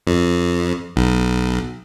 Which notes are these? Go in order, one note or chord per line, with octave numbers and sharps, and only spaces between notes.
F2
B1